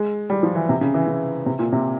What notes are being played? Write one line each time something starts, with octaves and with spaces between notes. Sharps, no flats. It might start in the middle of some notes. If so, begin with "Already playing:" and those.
Already playing: G#3
G3
F3
E3
C3
C#3
E3
C#3
C3
A#2
C3